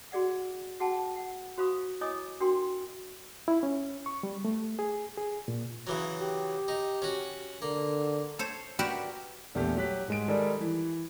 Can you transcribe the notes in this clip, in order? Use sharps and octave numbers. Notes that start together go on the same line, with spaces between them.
F#4 G#4 D5 F#5
F#4 G#4 F#5 G5 A5
F#5
F#4 C5 F5 B5 C#6 D#6
E4 C#5 D#5 G#5 D6 D#6
D4 F#4 A#4 G5 C6
E4
C#4
C#6
G3
A3
G#4
G#4
A#2
C#3 E3 F#3
G4
D#4
C#4 F#4
D3 A#3
A4 C5 C#5
F#4 G4 A#4 B4 D5 E5
A#1 E2 A3 G4
F#3 G4 F#6 B6
G#2 G#3 D7
D#3 G3 G#3 A4 A#4 D5
E3